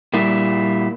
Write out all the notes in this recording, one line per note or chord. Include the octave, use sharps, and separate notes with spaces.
A#2 G3 A#3 E4